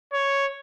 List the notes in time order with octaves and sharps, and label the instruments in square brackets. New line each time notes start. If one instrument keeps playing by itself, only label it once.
[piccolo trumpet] C#5